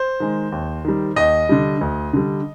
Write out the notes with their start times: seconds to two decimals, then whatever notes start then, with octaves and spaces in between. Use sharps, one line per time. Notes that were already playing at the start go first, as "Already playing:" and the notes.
Already playing: C5
0.20 D#3 G#3
0.52 D#2
0.85 D#3 G3
1.16 D#2 D#5
1.49 D3 G3
1.81 D2
2.13 D3 G3